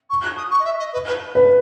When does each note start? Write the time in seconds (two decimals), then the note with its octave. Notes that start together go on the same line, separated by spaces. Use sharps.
0.10 C#6
0.23 F#6
0.37 D#6
0.51 C#6
0.59 D#5
0.65 E5
0.79 D#5
0.93 B4
1.07 B4
1.35 B4